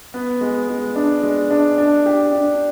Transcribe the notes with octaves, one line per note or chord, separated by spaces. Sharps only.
B3
G#3
G#3
D4
G#3
D4
D4
G4
D4